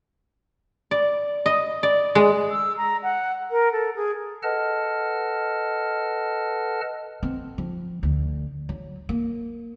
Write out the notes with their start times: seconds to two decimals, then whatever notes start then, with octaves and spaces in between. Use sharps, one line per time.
0.91 D5
1.46 D#5
1.83 D5
2.15 G#3
2.51 E6
2.77 A#5
3.03 F#5
3.51 A#4
3.72 A4
3.96 G#4
4.43 A4 B4 D#5 F#5 A5 F6
7.23 C4
7.58 F3
8.03 D2
8.69 F#3
9.09 A#3